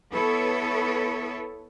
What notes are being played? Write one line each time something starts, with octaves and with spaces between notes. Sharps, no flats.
B3 E4 A4 B4 C#5